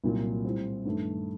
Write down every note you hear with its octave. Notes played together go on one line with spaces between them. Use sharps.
C2 A#2 F#3
A2 G3 C4
G2 D#3 A3